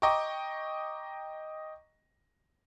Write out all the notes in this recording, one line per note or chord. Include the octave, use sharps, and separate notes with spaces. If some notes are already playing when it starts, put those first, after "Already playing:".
D#5 G5 A#5 C#6 D6